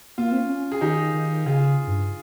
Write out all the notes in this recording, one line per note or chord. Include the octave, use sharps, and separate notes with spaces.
A#3 F4
C4
C#4
G#4
D#3 D#4 G4
D#3
C#3 F4 G#4
G2